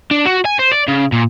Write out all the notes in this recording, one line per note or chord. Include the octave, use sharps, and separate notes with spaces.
D4
F#4
G#5
C5
D5
C#3
A#2